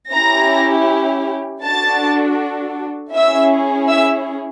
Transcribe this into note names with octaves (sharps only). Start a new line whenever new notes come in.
C#4 E4 G4 A#5 A#6
D4 F#4 A4 A5 A6
C#4 E4 G#4 E5 E6
E5 E6